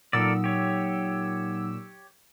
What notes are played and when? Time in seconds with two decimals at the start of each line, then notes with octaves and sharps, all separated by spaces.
0.13 A#2 F#3 D#4 A4 A#4 D5 E6
0.44 G4 C#5